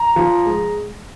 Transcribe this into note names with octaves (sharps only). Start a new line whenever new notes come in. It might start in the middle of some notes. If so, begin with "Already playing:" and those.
Already playing: A#5
F3
G#3